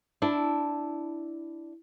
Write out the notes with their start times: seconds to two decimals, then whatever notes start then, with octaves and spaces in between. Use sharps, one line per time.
0.22 D4 E4